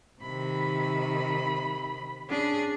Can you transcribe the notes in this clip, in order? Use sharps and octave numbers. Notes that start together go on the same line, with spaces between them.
C3 D#3 B5
C#4 D4 G#4